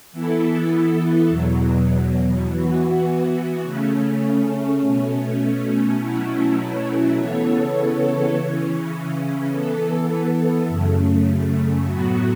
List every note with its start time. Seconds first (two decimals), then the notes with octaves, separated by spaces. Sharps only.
0.12 E3 B3 E4 A4
1.29 E2 B2 F#3
2.47 E3 B3 F#4
3.63 C#3 A3 C#4
4.82 B2 A3 C#4
5.98 B2 F#3 A3 C#4 E4
7.16 C#3 E3 B3 A4 C#5
8.33 C#3 E3 C#4
9.51 E3 B3 A4
10.68 F#2 C#3 A3
11.86 A2 F#3 B3 F#4